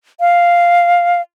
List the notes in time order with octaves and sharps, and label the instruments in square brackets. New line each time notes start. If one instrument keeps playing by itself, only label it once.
[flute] F5